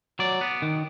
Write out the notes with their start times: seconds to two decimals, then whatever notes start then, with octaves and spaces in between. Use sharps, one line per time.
0.19 F#3 D5
0.41 B3
0.62 D#3